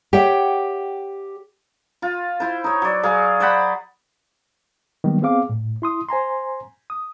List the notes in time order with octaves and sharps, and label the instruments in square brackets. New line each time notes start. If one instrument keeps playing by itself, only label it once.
[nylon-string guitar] G4 C#5 E5 F#5 G5
[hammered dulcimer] F4
E4 C5
D#4 C#5
F#3 D5
F#3 G#4 F5
C5 D5 F#5 B5
[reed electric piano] D#3 F#3 G3 A#3 B3
B3 C4 G#4 F5 D6
A2
E4 C6 D#6
C5 G#5 A#5 C6
D#6